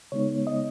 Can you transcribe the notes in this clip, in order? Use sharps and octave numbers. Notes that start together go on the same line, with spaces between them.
C#3 G#3 B3 D#4 C#5
D#5